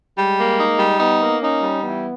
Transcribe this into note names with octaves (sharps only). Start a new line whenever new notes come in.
G3 G#3
A#3
D#4
G3
B3 D#4
A#3
C#4 D#4
G3
E3 B3